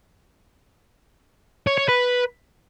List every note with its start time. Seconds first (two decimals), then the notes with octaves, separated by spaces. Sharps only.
1.67 C#5
1.78 C#5
1.88 B4